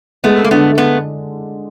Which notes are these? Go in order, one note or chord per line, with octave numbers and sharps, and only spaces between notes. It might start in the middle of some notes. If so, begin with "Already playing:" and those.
G#3 A3 B3
A#3
D3 A3 B3
A3 B3